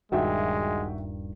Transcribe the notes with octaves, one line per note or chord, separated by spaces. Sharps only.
D#1 G2 D#3 G#3 F#4 E5 G5